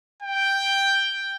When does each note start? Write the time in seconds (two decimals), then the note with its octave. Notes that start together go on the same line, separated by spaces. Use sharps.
0.23 G5